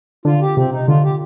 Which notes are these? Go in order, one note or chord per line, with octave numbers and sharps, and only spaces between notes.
D3 F4
G4
C3 C4
D#4
D3 F4
G4